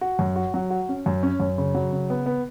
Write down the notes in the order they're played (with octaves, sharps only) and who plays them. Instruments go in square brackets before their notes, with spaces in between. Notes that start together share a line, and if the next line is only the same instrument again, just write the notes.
[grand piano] F#4
F#2
F#4
F#3
F#4
C#4
F#2
C#4
F#2
C#3
F#3
C#3
B3
B3